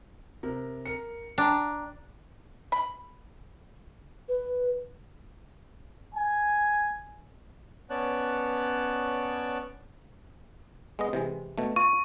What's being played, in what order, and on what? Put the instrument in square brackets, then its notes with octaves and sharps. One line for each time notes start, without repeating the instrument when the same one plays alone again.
[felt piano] C3 A#4
A#4 C#7
[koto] D4 [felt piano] G5 A#5
[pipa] B5
[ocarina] B4
[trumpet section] G#5
[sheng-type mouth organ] B3 C#4 C#5 D5 A5 F#6
[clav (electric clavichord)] G#3 B3 D#5
C3 E3 G#3
B2 A3
[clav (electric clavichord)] F4 [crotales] C#6